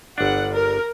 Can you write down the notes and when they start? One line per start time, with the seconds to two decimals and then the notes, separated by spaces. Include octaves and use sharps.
0.18 G1 D4 F#5
0.53 A#4